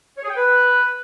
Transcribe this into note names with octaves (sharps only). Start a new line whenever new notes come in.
C#5
G#4
G5
B4